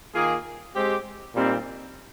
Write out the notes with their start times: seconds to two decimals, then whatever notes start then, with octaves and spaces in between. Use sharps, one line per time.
0.14 D#3 A#3 F4 G#4
0.74 G#3 C4 G4
1.34 A#2 G3 C4 D#4